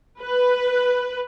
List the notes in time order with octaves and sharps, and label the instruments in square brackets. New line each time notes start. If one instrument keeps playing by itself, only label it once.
[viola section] B4